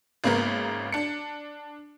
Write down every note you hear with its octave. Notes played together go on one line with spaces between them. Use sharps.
G#1 C#3 A#3 B3 A#4
D4 C#7